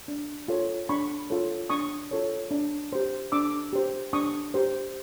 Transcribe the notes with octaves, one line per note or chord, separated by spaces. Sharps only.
D4
F4 A4 C#5
D4 B5 C#6
F4 A4 C#5
D4 C#6 D#6
F4 A4 C#5
D4
G4 C5
D4 D6 E6
G4 C5
D4 C#6 D#6
G4 C5